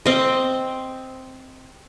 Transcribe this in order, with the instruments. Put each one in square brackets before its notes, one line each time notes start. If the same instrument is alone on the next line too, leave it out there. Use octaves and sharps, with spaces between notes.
[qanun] C4 D#5